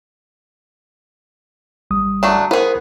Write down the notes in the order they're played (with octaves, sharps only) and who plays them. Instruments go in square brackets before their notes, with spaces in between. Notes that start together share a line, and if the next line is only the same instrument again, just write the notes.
[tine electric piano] G#1 G3 D#6
[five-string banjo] F#3 A3 D4
[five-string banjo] B3 G#4 [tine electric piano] E4 A#4 C5